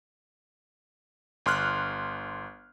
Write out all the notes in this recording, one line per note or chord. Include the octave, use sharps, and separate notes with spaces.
G1 C6 F6 F#6